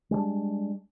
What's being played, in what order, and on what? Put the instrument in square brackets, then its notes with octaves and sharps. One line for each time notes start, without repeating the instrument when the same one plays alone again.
[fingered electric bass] G3 G#3 A#3 D4